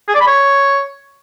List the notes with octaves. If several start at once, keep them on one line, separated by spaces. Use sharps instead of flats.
G#4
D5
B5
C#5